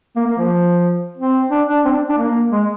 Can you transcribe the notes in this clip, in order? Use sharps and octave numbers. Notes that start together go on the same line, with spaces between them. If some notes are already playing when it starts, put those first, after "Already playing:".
A#3
A#3
F3
C4
D4
D4
C4
D4
D4
A#3
G#3